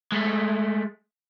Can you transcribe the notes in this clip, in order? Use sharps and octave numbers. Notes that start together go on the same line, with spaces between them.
G#3 A3